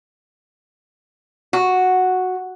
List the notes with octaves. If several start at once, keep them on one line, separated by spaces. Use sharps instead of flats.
F#4